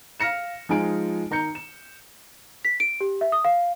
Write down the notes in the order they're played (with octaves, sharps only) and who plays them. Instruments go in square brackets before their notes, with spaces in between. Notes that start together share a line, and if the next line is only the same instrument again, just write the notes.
[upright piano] F5 F6 A#6 C#7 E7
F3 G#3 D#4 F4 G#5 D7
D#3 A#5 G6 C#7
E7
[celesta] B6
D7
G4
E5
D#6
F5